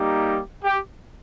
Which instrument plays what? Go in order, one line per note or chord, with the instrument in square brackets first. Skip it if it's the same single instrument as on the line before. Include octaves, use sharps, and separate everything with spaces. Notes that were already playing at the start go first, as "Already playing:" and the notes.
Already playing: [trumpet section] G3 A#3 D#4 G4
G4 G5